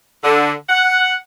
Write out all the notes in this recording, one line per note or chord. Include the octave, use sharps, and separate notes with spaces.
D3
F#5